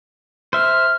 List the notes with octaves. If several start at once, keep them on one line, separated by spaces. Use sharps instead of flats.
C5 E5 F6